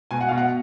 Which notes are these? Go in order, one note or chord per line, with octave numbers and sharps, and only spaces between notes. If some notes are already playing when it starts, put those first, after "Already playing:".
B2 G#5
F#5
B2 F5
F#5